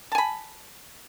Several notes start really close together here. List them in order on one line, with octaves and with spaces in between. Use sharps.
A5 G#5 B5